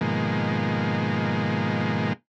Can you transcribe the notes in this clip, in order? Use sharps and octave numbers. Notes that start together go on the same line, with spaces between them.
G#2 B2 D#3 F3 G#3 A#3